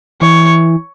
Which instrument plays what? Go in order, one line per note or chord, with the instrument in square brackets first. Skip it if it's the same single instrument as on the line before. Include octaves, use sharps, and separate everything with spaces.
[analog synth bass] E3 [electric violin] C#5